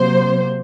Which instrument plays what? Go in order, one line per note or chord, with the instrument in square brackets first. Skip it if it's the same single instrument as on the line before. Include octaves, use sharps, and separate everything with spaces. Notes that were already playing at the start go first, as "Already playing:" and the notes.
Already playing: [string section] C3 F#3 A#3 C5